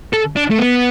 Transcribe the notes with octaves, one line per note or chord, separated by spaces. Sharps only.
A4
D4
A3
B3